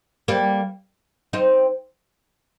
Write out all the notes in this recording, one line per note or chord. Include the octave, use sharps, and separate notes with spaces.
G3 A#3
C4 D#4